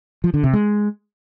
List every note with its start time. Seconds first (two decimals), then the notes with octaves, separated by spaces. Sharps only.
0.24 F3
0.34 D3
0.44 C3
0.53 G#3